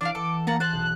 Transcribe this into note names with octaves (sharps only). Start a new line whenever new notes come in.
E3 D4 D5 F5 D6
A4 F#5
A#3 G#4 F#5 A5 A#5
C5 A5 F#6
B1